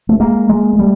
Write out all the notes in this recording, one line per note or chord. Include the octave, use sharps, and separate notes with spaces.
A3
G#3 A#3
G#3 A#3
A#3
G3 A3